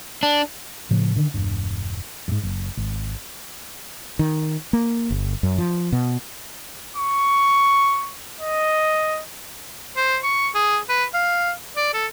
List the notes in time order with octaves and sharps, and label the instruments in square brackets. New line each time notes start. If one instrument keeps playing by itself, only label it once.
[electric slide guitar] D4
[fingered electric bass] A2 C#3 F3
D3 D#3
E1 G2
F2 G#2
F#1
G#1
[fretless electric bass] D#3
A#3
G1
F#2
F3
B2
[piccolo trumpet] C#6
D#5
[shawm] C5
C#6
G#4
B4
F5
D5
A4